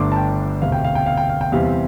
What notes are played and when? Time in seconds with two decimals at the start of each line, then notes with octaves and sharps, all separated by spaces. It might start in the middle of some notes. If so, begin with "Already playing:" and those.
Already playing: G1 G2 D3 A3 D4 C6 D6
0.12 A5
0.16 G5
0.61 E1 D2 C3 F5
0.72 G5
0.84 F5
0.95 G5
1.06 F5
1.18 G5
1.30 F5
1.41 G5
1.52 E2 C3 G3 C4 F5